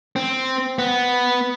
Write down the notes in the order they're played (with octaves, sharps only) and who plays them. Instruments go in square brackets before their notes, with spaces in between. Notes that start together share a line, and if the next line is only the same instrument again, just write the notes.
[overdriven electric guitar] C4
B3